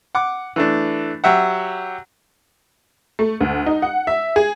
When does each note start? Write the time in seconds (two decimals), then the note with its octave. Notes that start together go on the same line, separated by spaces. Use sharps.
0.15 F#5 D6
0.56 E3 A3 D4
1.24 F#3 G4 E5 F#5
3.19 A3
3.41 D2
3.66 D#4
3.82 F#5
4.07 E5
4.36 G#4